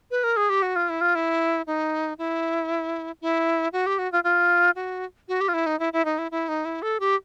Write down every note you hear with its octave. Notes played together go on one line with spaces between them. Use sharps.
B4
A#4
G#4
G4
F#4
F4
E4
F4
E4
D#4
E4
E4
F#4
G4
F#4
F4
F4
F#4
F#4
G4
F4
E4
D#4
E4
E4
D#4
E4
E4
D#4
E4
A4
G4